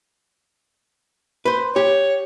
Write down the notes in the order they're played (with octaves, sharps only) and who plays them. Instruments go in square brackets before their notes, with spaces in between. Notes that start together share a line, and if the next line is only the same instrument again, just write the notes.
[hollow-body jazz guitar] B4 C5
[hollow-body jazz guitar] G4 [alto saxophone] C#5